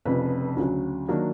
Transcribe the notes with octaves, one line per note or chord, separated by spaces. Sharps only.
F1 F2 C#3 B4
D2 C#3 F#3
D#3 F#3 A#3 D4